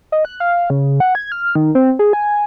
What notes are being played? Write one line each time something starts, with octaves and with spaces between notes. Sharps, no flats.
D#5
F#6
F5
C#3
F#5
G#6
F6
D#3
C4
G#4
G#5